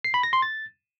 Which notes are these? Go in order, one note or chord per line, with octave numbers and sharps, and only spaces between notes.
C7
B5
A#6
C6
A6